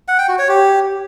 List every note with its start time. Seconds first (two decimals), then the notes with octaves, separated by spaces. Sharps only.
0.08 F#5
0.18 G5
0.29 F#4
0.39 C#5
0.49 G4